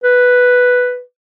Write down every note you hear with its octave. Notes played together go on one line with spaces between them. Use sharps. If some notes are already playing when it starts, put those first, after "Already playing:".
B4